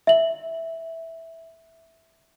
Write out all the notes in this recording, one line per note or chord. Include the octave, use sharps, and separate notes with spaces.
E5 F#7